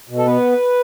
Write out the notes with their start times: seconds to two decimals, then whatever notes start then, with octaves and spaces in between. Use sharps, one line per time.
0.09 B2
0.18 A4
0.26 B3 B4